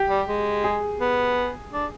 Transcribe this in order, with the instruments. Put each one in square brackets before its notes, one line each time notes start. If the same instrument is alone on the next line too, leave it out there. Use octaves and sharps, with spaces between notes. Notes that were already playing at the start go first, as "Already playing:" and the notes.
Already playing: [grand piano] G4
[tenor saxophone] G3
G#3
[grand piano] G#4
[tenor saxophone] B3
D4